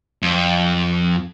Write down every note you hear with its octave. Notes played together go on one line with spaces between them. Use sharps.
F2